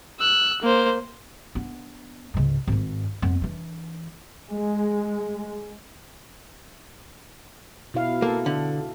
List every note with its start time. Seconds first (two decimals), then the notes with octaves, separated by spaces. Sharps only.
0.20 E6 F#6
0.62 A#3 C5
1.55 B3 D4
2.34 C#2 G#2
2.67 G#1 G#2
3.22 F2 B3
3.41 E3 D4
4.51 G#3
7.94 B2 E4 F5
8.22 A#3 A4
8.46 D3